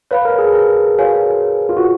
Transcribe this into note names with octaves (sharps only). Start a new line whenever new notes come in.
B4 C#5 F5 B5
A#4
G#4
A#4
F#4 C#5 F5 G#5
F4
F#4